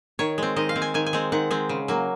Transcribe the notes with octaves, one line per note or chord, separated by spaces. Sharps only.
D#3 C#5
G#3 C4
D#3 D#5
F5
G#3 C4
G#5
D#3 G#5
G#5
G#3 C4
D#3 F#5
G#3 C4
C#3
F#3 A#3